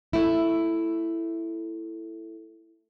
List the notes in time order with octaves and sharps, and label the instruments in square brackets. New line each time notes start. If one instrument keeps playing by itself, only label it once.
[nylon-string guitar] A3 E4